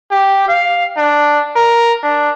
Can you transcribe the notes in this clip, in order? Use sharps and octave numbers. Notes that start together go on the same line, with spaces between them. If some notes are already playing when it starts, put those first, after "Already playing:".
G4
F5
D4
A#4
D4